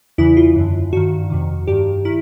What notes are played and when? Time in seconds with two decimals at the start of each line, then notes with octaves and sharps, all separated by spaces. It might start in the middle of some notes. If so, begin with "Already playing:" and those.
0.18 E2 C#3 E3 E4
0.37 F4
0.56 F#2 D3
0.93 G2 D#3 F#4
1.30 F2 C3 D#3
1.67 G2 D#3 G4
2.05 D#3 E4